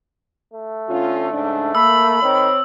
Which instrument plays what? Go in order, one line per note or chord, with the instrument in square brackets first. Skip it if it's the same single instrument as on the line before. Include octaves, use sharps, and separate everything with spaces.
[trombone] A3
[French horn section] D3 C#4 F4
G#2 C#3 D4
[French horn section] A#3 [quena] B5 [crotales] E6
[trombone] D#3 [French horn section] C4 C#5